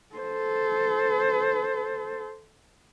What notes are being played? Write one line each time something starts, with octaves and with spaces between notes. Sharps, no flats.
A4 C5